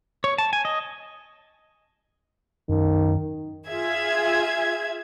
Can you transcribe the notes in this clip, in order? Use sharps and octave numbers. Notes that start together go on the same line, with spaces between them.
C#5
A5
G#5
D#5
F#2 D#3
F4 G#4 E5 G#6